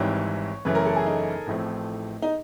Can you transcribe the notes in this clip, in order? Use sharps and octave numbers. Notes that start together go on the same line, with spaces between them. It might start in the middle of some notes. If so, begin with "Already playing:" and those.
Already playing: G#1 G#2 E3 G3 C4 C#5
F#2 C#3 E3 A3 C#4 B4
A#4
A4
G#4
D#4
A1 A2 F3 A3 C4
D#4